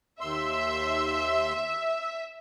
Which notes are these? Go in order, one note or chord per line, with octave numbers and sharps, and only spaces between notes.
D#2 E5 C6 E6